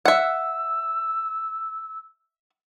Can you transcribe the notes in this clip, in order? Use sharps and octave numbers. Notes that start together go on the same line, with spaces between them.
E5 F#5 E6